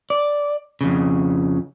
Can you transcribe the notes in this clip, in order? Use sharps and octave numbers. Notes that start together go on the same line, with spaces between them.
D5
F2 C#3